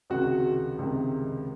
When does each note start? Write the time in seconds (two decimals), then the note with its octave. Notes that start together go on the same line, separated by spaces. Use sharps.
0.10 C#2 C3 D#3 G#3 F#4
0.78 C#2 C3 D#3 G#3